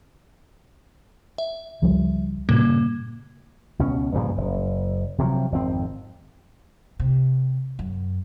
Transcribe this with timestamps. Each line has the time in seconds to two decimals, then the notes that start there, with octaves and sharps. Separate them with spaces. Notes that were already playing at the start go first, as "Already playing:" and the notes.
1.38 E5
1.82 C#2 F3 G3
2.49 G2 A#2 C#3 A#3
3.79 C#2 B2 C#4
4.14 G2 A#2 C#3 F3
4.37 F#1
5.18 C3 D#3 F3 F#3
5.52 G#1 F2 C4
7.00 C3
7.79 F#2